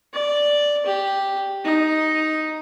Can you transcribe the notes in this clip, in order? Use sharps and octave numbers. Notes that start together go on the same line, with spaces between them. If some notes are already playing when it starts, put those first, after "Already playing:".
D5
G4
D#4